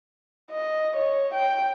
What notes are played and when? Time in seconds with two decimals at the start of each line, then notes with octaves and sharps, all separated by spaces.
0.52 D#5
0.96 C#5
1.34 G5